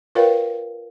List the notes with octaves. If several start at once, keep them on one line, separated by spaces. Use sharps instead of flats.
F4 A#4 B4 C#5 F5 G5